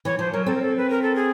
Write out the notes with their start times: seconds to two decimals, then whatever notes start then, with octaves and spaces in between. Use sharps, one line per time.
0.05 E3 C#5
0.19 F3 C5
0.32 F#3 A#4
0.46 C4 A4
0.55 A#4
0.62 A4
0.77 B4
0.90 A#4
1.03 A4
1.16 G#4